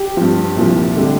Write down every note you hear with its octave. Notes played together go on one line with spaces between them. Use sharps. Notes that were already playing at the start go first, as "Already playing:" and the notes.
Already playing: G4
G2 F3
C2 A#2 F3
D3 G3